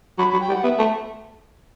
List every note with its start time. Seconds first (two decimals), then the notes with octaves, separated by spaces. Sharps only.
0.18 F#3 B5
0.30 F#3 B5
0.41 G5
0.48 G3
0.52 F#5
0.64 B3 E5
0.79 A3